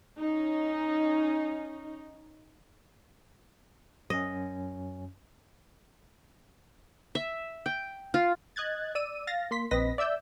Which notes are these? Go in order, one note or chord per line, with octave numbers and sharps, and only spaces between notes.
C#4 D#4
F#2 C#4 D#5
E5
G5
F4
D#5 F#6 G#6 A6
D5 E6 D#7
F5 A6 A#6
A#3 C6 B6
A#1 C4 B4 D#5 A#6 B6
D5 E5 E6 G6